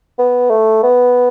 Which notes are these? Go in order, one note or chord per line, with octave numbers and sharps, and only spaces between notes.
B3
A3
B3